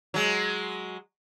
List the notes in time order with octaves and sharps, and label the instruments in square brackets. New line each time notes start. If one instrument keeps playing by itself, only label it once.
[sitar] F#3 G#3